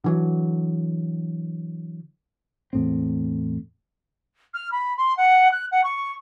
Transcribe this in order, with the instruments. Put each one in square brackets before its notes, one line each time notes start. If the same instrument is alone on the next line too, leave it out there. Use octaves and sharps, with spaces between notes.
[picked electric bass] D3 E3 F#3
[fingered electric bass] E2 A2 C4
[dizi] F6
B5
C6
F#5
F#6
F#5
C#6